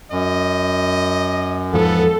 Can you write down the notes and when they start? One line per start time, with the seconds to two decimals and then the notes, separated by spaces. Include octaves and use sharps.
0.12 F#2 D#5
1.74 E2 G#2 F3 B3 A4